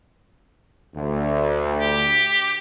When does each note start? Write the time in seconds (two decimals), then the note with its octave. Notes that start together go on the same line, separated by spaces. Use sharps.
0.95 D2
1.80 G4